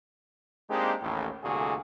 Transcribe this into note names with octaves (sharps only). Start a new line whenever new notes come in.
G#3 A#3 C4 D4 D#4 G4
A1 D#2 A2
C2 A#2 D3 A3 F#4 G#4